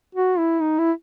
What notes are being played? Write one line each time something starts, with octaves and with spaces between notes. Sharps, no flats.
F#4
E4
D#4
E4